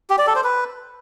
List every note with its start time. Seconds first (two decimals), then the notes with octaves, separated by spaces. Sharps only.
0.10 G4
0.19 D5
0.27 A4
0.36 C5
0.44 B4